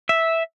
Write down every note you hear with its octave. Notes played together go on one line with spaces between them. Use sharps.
E5